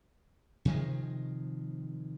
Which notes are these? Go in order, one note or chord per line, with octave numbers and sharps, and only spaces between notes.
C3 D#3 F3 G#3